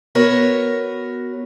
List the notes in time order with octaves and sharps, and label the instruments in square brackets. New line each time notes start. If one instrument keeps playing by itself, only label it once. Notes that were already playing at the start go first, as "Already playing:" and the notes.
[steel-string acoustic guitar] B3 F#4 A#4 C#5